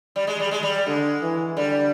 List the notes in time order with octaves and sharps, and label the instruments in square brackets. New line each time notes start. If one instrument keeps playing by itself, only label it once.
[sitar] G3
G#3
G3
G#3
G3
[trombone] D3 [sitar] G#3
[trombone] E3
[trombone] D3 [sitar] G3